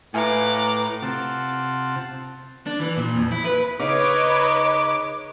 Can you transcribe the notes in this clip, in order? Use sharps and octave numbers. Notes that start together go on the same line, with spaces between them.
A2 F4 B4 E5 G#5 A#5 D6
C3 C4 F4 F#5 A5
D4
E3
A#2
F2
E4
B4
C#3 D#4 B4 C#5 D#5 D6